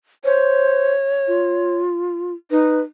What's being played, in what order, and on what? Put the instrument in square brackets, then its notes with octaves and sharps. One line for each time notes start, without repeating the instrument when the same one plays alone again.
[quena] C5 [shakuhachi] C#5
[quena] F4
[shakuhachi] D#4 [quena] B4